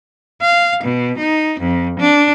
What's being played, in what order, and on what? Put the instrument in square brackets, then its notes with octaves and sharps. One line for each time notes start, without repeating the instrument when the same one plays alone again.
[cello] F5
B2
D#4
F2
D4